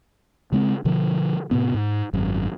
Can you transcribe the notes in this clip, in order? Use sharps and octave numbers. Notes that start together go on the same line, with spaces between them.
C#3 G#3 C4
B2 D3 F3
A2 C3 B3
G#2
G#1 F#2